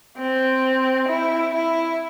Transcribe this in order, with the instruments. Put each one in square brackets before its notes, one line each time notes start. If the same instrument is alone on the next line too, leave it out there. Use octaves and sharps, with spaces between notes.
[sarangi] C4
E4
E4